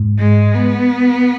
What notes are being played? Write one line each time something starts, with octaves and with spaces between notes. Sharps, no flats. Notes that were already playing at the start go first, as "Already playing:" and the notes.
Already playing: G#2
G#3
B3